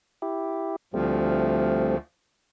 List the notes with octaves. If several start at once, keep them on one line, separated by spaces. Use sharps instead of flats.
E4 G4
D2 F3 G3 A3 C4